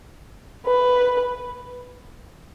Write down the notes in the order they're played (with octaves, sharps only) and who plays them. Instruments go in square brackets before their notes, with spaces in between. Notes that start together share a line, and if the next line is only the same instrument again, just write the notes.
[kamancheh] B4